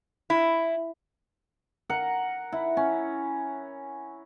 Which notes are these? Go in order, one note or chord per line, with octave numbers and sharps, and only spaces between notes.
E4
A#4 F#5
E4
C#4